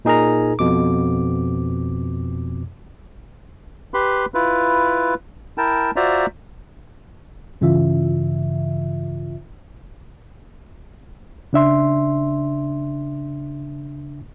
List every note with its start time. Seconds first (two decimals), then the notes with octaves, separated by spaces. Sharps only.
0.05 A#2 D#4 G#4 A#4 A#5
0.59 F2 B2 D6
3.94 G4 B4 B5 C6
4.34 E4 F4 B4
5.58 E4 A#4 G5 A5
5.96 F4 F#4 C5 D5 E5 A#5
7.61 G2 C#3 E3 F4 E5
11.53 C#3 D4 E5 C6